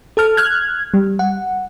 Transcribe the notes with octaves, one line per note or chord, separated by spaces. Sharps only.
A4 A5 F6
F6 F#6 G#6
G3
F#5